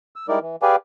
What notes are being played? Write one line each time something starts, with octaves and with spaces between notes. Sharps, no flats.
E6
G3 G#3 D#4 E4 A#4 D5
E3
G4 G#4 B4 D5 F5 G#5